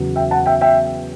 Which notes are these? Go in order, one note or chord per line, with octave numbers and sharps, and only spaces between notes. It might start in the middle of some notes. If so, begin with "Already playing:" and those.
Already playing: E2 C#3 F#3 B3
E5 G5
F#5 A5
E5 G5
E5 G5